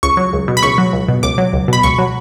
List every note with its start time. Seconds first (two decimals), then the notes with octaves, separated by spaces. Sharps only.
0.03 C#2 C#6
0.17 F#3
0.33 C#2
0.48 B2
0.57 B5
0.63 C#2 C#6
0.78 F#3
0.93 C#2
1.08 B2
1.23 C#2 D6
1.38 F#3
1.53 C#2
1.68 B2 B5
1.83 C#2 C#6
1.98 F#3